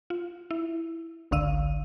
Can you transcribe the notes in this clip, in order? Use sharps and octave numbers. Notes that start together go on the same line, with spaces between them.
F4
E4
G#1 C#2 D3 F5 E6 D#7